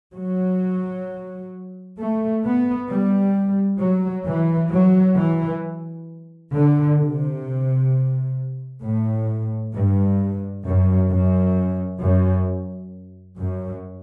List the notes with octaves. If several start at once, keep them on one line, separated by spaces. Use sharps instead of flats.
F#3
A3
B3
G3
F#3
E3
F#3
E3
D3
C3
A2
G2
F#2
F#2
F#2
F#2